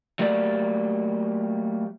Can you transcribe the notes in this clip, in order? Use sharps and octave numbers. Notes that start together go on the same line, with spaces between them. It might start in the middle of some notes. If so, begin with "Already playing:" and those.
F#3 A3 A#3 G4 D5